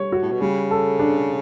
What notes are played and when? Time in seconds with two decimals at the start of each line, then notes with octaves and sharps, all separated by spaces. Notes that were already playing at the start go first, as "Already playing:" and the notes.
Already playing: G3 C#5
0.12 F#4
0.22 A2
0.32 B2
0.41 C#3 G3
0.71 A4
0.99 D4